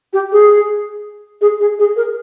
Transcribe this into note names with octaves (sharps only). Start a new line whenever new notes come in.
G4
G#4
G#4
G#4
G#4
A#4